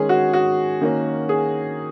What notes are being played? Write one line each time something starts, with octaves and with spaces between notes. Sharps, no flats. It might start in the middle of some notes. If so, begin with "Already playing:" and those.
Already playing: D#3 G#3 C#4 G#4
F#4
F#4
D#3 A#3 C#4
G#4